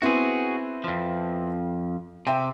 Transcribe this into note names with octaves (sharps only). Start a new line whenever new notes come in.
B3 C4 E4 F#4 G#4
F2 F3
C3 E5 G5